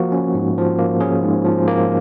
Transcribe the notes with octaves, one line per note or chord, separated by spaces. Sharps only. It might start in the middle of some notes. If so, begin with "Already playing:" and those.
Already playing: F3 A#3 F#4
C#4
G#2
F3
A#3
C#4 G#4
G#2
F3
A#3